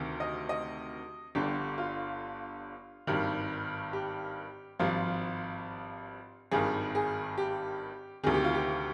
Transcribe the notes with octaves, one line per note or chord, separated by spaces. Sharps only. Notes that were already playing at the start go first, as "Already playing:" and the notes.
Already playing: D2 C3 D#3
D#5
D#5
G1 G2 D3 G4
F4
G#1 G2 D#3
G4
G#1 G2 F3 F4
G#1 G2 D#3 G#4
G#4
G4
D2 C3 D#3 G#4
G4
F4
G4